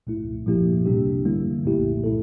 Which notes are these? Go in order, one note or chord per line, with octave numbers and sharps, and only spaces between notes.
C2 A#2 A3 E4
A#2 F3 A#3 E4 G4
C2 C3 G3 D4 G4
D3 G3 A#3 E4
C2 A#2 A3 E4 G4
A3 E4 A4